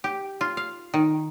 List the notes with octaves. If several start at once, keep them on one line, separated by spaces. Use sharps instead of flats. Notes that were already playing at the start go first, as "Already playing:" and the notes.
G4
F4
F5
D#3